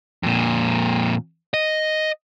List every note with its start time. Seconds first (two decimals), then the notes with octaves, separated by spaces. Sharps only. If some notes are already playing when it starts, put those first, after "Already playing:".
0.23 F2 A#2
1.54 D#5